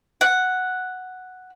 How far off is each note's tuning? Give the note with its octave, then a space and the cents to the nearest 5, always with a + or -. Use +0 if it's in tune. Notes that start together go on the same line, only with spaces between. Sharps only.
F#5 +0